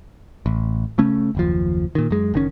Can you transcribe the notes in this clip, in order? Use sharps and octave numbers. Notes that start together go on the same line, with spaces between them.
A1
C#3 A3 C#4
F#1 D#2 F3
A#2 D#3
F#2 G#3
F#1 D#3 C#4